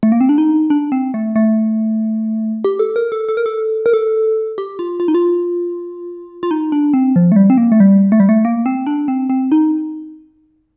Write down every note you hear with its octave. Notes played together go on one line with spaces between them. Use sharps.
A3
A#3
C4
D4
D#4
D4
C4
A3
A3
G4
A4
A#4
A4
A4
A#4
A4
A#4
A4
G4
F4
F4
D#4
F4
F4
D#4
D4
C4
F3
A3
G3
C4
A#3
A3
G3
A3
G3
A3
A#3
C4
D4
C4
C4
D#4